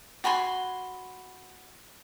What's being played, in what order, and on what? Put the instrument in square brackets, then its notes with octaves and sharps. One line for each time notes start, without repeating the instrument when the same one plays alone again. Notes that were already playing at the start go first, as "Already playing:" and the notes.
[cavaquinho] F#4 G#5 B5 C6